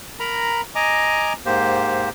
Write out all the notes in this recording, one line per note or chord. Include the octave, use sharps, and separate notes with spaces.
A#4 A#5 B5
D#5 G#5 A#5 D6
G#2 A#3 G4 C5